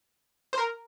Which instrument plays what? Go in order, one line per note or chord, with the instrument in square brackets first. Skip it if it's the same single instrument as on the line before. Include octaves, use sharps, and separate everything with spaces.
[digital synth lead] C5
A#4